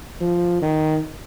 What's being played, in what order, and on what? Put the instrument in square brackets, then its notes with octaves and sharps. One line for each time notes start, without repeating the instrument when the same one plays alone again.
[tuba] F3
D#3